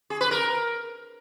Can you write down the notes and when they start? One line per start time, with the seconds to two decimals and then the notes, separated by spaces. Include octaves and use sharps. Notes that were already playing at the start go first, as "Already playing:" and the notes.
0.10 G#4
0.21 B4
0.31 A#4